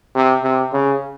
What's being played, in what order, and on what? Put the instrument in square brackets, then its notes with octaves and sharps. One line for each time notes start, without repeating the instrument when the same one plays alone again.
[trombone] C3
C3
C#3